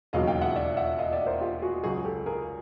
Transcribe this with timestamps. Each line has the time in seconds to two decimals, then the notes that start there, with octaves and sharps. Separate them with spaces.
0.13 E1 D#2 C#3 F#3 D#5 F5
0.27 F5 G5
0.41 E5 F#5
0.56 D5 E5
0.77 E5 F#5
0.98 D#5 F5
1.13 D5 E5
1.26 A#4 C5
1.41 F4 G4
1.62 F#4 G#4
1.84 C#2 C#3 F#3 F#4 G#4
2.05 G4 A4
2.26 G#4 A#4